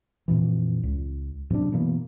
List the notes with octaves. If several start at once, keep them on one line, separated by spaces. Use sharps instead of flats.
F2 A#2 E3
C#2
F#2 C3 C#4 D4
B2 E3 A#3 B3